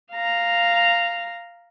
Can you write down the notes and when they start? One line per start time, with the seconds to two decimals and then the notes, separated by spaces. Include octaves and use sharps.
0.12 F5 A#5